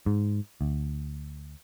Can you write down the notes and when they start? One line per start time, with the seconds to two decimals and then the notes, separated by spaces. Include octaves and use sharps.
0.06 G#2
0.61 D2